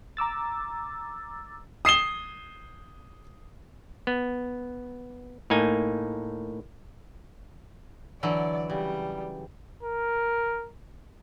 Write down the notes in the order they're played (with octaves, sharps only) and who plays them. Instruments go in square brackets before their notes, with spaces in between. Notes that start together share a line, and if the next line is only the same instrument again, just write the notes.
[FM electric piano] A#5 D6 E6 A6
[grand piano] D#6 C7 E7 G7
[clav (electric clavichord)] B3
A2 A#3 D#4 G#5
[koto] D3 E3 F#3 [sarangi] D5
[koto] C#3 [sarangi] G3
[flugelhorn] A#4